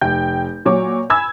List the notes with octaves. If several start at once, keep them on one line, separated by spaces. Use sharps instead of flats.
F1 G5 G6
A#2 F#3 C#5 D6
G#5 B5 E6 G#6